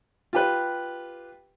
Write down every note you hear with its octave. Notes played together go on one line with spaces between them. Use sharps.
F4 G4 B4